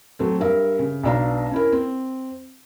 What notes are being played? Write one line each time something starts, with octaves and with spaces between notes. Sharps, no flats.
F#3 A3 C4
G2 A#4 E5
C#3
B1 B2 D4 F5 A#5
C#4 E4 A#4
C4